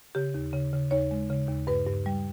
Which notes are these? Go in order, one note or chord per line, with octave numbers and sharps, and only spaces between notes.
C#3 G4
D#2
C#3
C#3
D#2 C#5
G#3
C#3
D#2
G2 B4
G2
G3